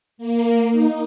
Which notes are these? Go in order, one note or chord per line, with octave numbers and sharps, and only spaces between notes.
A#3
D#4